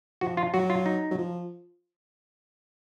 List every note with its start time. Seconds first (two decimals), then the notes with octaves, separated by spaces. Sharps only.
0.21 F3 F#4
0.37 F4
0.54 F#3 F#4
0.70 F4
0.86 D#4
1.11 F#3
1.18 F3